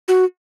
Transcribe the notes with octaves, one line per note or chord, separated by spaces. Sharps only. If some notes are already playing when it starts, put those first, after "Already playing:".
F#4